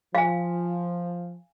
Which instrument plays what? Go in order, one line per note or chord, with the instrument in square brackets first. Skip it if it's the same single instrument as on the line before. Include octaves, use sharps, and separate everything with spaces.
[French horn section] F3 [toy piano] F5 G#5